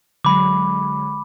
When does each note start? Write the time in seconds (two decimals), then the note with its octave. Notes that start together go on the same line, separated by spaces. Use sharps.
0.25 D3 F#3 G#3 B5 D6